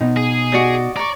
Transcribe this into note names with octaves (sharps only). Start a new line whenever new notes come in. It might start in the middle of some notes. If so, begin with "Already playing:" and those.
B2 D#4
G#4
F#4 D5 D#5
D5 A#5 C#6